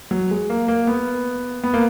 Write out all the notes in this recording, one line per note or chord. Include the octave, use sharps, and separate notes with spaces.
F#3
G#3
A#3
A#3
B3
B3
A#3